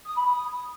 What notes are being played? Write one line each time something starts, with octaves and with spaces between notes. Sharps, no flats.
D#6
B5
D#6